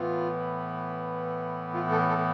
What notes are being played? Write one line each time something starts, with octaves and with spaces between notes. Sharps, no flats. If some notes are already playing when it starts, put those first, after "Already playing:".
Already playing: A2 E3 B3 F4
F4
A4
A4